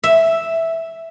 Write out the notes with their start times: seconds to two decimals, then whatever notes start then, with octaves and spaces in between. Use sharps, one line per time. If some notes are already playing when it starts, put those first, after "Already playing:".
0.04 E5